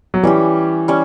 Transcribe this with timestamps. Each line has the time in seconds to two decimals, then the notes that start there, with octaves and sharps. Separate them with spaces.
0.14 F#3
0.23 E3 G3 C#4 G4
0.88 G3 C#4